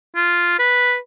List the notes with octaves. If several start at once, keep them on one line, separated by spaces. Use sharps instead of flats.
F4
B4